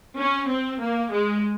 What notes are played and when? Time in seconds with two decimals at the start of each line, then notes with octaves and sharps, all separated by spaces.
0.17 C#4
0.49 C4
0.80 A#3
1.12 G#3